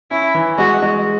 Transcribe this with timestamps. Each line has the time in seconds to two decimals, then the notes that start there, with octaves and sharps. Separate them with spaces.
0.11 C#4 E4
0.35 E3
0.58 G#3 F#4
0.82 G#3